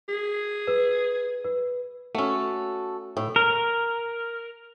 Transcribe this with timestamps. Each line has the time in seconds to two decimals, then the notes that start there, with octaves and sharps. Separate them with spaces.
0.09 G#4
0.67 B4
1.44 B4
2.15 A3 C#4 F#4 A4
3.17 A2
3.36 A#4